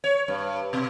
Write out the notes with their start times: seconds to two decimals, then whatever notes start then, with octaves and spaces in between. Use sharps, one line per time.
0.04 C#5
0.28 G2
0.73 B2